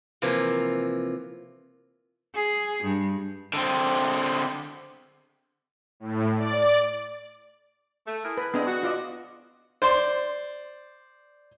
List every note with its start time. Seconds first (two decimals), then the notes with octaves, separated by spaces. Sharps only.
0.22 C3 E3 F3 A#3
2.34 G#4
2.82 G2
3.53 D3 C4
6.00 A2
6.37 D5
8.07 A3
8.25 E4 G#4 A#4
8.37 B4
8.54 B3 C4 D4 E4 G#4 D#5
8.67 F#4
8.83 F4 D5 D#5
9.82 C5 D5 C6